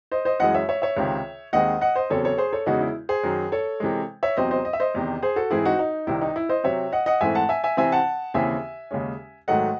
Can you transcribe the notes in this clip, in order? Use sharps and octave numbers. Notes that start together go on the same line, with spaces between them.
C5 D#5
C5 D#5
F#2 E3 G#3 D#5 F#5
C#5 E5
C#5 E5
C#5 E5
C#2 C3 D#3
D#2 D#3 G#3 C4 D#5 F#5
D#5 F#5
C5 D#5
E2 C#3 F#3 C4 A4 C#5
A4 C#5
G#4 C5
A4 C#5
E2 C#3 G#3 D#4 F#4
E4
G#4 C5
F#2 D#3 F#3
A4 C#5
C3 E3 G#3
C#5 E5
E2 C3 F#3 C4 C5 D#5
C5 D#5
D#5
E5
C5 D#5
E2 C3 D#3
G#4 C5
F#4 A4
G#2 E3 C4 E4 G#4
D#4 F#4
D#4
C2 C3 D#3 E4
D#4
E4
C5 D#5
C3 F#3 C4 C#5 E5
D#5 F#5
D#5 F#5
G#2 E3 A3 C4 E5 G#5
F#5 A5
E5 G#5
E5 G#5
C3 E3 C4 E5 G#5
F#5 A5
D#2 C#3 E3 C4 E5 G#5
D#2 C#3 G#3 C#4
G#2 D#3 F#3 A3 D#5 F#5